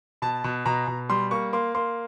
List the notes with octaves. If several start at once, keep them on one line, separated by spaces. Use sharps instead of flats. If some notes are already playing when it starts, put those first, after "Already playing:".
B2 A5
B2
B2 A#5
B2
G3 C6
A#3 C#6
A#3 C6
A#3 C6